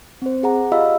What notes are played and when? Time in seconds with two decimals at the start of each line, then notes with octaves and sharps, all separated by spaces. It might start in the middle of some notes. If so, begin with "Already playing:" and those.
0.22 C4 C5
0.43 G#4 F#5 A#5
0.72 F4 G4 D#5 F5 B5 E6